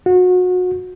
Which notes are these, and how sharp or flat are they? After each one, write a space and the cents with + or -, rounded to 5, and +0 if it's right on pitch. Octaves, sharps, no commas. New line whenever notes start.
F#4 -30